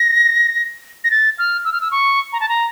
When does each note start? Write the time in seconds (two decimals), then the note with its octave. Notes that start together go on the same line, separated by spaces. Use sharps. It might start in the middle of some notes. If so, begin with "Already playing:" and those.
Already playing: A#6
1.04 A#6
1.11 A6
1.38 F6
1.65 E6
1.72 F6
1.81 E6
1.91 C#6
2.33 A#5
2.40 A5
2.49 A#5